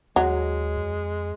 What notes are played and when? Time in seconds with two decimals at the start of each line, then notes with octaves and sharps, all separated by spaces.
0.16 D#2 F#3 G#3
0.77 F2